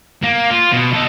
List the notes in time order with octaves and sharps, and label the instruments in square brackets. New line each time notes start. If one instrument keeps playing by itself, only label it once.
[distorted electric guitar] A#3
F4
B2
D#4 A4